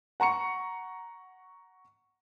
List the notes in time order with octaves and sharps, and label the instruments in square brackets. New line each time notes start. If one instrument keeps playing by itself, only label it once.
[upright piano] F#5 A#5 C#6 C#7